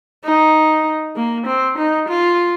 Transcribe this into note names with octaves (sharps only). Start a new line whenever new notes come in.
D#4
A#3
C4
D#4
F4